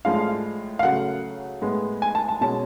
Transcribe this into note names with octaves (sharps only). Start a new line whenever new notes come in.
A2 F3 G#3 D4 F5
F5
C#3 F#3 A3 F#5
A2 G#3 B3
G#5
A5
A5
B2 G#3 C#4 A5